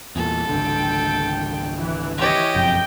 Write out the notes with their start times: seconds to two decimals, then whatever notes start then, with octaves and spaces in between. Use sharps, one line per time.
0.16 E2 A#2 A4
0.49 G#1 C#2 D3 G5
1.80 E3
2.18 E3 G4 C#5 D#5
2.54 F#1 B1 F2 G5